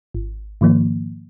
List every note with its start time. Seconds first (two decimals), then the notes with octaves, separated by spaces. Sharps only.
0.14 G#1
0.61 G#2 D#3 F3 A#3